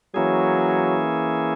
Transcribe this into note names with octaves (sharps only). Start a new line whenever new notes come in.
E3 F#3 A#3 C#4 E4 G#4